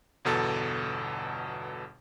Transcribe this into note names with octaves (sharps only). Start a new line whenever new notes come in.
G1 E2 B2 A4 A6